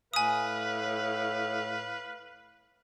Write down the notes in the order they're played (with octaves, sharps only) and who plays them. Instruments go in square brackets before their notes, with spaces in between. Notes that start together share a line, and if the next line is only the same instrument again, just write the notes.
[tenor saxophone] A2 [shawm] B4 [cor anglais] F5 [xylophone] G#5 D#6